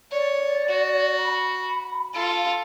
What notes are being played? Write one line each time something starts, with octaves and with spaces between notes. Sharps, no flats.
C#5 D5
F#4
B5
F4 A4